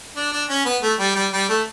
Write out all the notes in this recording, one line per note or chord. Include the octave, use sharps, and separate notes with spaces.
D4
D4
C#4
B3
A3
G3
G3
G3
A3